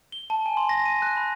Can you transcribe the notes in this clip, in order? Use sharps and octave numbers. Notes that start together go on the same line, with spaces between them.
G7
A5
G#5
C6
A#6
D#7
F#6
B5